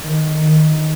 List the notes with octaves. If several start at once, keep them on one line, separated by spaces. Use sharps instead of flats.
D#3
D#3